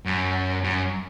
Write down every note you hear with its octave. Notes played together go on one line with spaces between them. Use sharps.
F#2
F#2